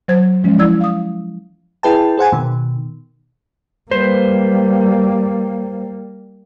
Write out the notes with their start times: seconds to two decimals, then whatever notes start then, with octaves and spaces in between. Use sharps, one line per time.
0.08 F#3 C5 G#6
0.44 F3 G#3 C#4
0.58 F3 E4 D5 E6 G#6
0.81 F5 D#6
1.83 E4 G#4 B4 G5 A5
2.17 G#4 C5 F#5 G#5
2.32 B2 D#3
3.91 G3 A#3 B4 C5